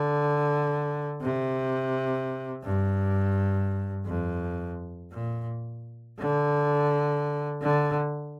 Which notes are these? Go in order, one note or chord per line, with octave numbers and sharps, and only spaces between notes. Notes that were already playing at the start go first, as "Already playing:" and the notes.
Already playing: D3
C3
G2
F2
A#2
D3
D3